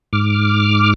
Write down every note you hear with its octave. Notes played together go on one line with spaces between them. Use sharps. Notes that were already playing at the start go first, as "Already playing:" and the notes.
G#2 D6 F6